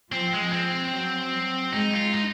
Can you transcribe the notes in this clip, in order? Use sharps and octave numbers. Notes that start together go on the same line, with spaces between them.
F3 C4
G#3
C4
F#3
F#3
G#3 D#4
F4
D#4